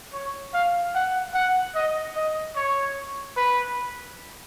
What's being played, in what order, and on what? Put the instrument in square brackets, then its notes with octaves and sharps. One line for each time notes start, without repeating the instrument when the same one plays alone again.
[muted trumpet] C#5
F5
F#5
F#5
D#5
D#5
C#5
B4